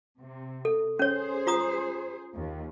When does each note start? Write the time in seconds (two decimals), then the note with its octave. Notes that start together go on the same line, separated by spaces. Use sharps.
0.21 C3
0.65 A4
0.99 C#4 G#4 C5 C#5
1.47 F4 A#5 D#6
2.34 D#2